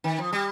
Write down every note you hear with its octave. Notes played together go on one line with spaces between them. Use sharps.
D#3
F3
G3